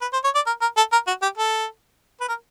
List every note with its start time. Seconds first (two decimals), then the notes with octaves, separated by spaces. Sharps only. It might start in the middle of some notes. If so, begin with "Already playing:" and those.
0.01 B4
0.13 C5
0.24 C#5
0.35 D5
0.46 A#4
0.61 A#4
0.77 A4
0.92 A#4
1.07 F#4
1.22 G4
1.38 A4
2.21 B4
2.28 A#4